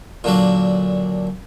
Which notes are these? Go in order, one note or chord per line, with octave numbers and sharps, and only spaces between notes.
A#2 D3 F#3